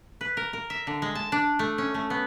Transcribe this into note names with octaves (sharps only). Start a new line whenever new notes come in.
B4
A#4
A#4
E5
D3
G#3
A5
D4
A3
C#4
A3
B3